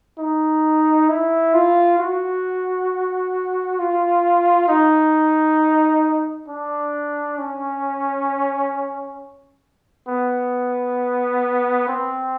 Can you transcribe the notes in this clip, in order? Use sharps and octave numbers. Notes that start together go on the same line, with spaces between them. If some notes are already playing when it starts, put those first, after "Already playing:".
D#4
E4
F4
F#4
F4
D#4
D4
C#4
B3
C4